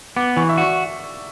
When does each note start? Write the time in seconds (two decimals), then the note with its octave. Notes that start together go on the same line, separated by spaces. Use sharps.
0.17 B3 D6
0.37 E3 C#6
0.49 E5
0.57 F#4 D5